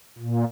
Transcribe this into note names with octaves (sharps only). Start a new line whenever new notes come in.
A#2